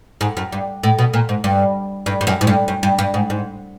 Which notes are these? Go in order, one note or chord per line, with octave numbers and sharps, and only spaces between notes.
G#2
F#2
G2
A2
B2
A#2
G#2
G2
G2
G2
F#2
G#2
G2
F#2
G2
G2
G#2
G#2